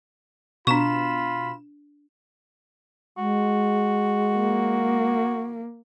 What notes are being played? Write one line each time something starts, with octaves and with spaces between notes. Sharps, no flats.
B2 D4 F4 B5 C#6 E7
G#3 F#4
A#3